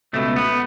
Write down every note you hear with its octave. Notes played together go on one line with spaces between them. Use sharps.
C#2 B2 A3
B3